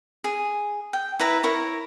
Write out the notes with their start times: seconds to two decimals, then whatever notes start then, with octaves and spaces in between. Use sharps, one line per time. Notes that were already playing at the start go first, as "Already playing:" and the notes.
0.24 G#4
0.93 G5
1.20 E4 B4 E5 A#5
1.43 E4 A#4 C#5